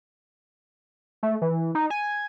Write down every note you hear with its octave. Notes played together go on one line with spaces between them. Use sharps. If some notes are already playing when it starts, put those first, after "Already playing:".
A3
E3
D#4
G#5